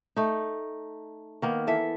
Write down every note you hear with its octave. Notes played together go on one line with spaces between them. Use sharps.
A3 D#4
D#3 A#3 B3
E3 A4 E5